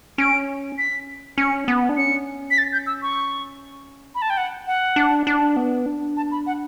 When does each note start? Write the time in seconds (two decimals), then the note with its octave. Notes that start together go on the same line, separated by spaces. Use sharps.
0.18 C#4 D7
0.78 B6
1.38 C#4 C#7
1.68 B3
1.89 D4
1.97 C#4 C#7
2.51 B6
2.58 A6
2.73 G6
2.87 E6
3.02 C#6
4.15 B5
4.22 A5
4.30 G5
4.37 F#5
4.67 F#5
4.96 D4
5.27 D4
5.56 B3
5.86 D4
6.17 A5
6.31 B5
6.47 F#5